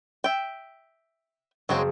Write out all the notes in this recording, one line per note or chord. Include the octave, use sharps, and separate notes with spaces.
E5 G5
F#1 F#3 G#3 C4